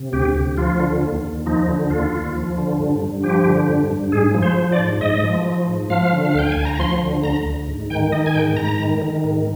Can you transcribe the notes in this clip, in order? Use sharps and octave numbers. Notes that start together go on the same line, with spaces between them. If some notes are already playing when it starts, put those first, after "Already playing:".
Already playing: C3
D2 G4
D2
F3 F4
D3
D#2
D#2
F3 D#4
D3
D#2 F4
D#2
F3
D3
G2
G2
F3 G4
D3
G2
G2
G#2 G#4
F3
C5
F3
D5
G#2
G#2 D#5
F3
F3
G#2
F3 F5
D3
F5
D2 G5
D2 G#5
A#5
F3 C6
D3
D2 A#5
D2
G#2
D#3 G5
D#3 D#5
G#5
G#2 G5
G#2 A#5
D#3
D#3
G#2